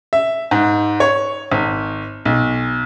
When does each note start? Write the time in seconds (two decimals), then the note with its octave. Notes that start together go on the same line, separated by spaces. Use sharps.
0.13 E5
0.51 G#2
1.00 C#5
1.52 G#1
2.25 B1